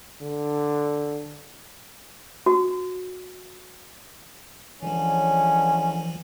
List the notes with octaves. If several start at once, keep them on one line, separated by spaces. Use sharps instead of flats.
D3
F#4
C#2 D3 E3 F3 C#4